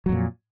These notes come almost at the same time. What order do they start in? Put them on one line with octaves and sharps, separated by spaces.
F#3 F2 A#2